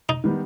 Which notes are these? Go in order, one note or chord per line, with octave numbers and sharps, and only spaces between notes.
D#4
D#3 G3 B3